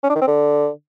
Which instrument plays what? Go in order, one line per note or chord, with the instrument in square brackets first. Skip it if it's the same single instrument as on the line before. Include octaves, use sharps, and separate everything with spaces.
[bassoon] C#4
D4
D#3
C4
D3